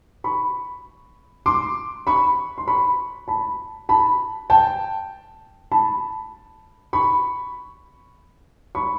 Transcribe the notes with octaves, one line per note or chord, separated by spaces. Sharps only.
B5 C#6
C6 D6
B5 C#6
C6
B5 C#6
A5 B5
A5 B5
G5 A5
A5 B5
B5 C#6
B5 C#6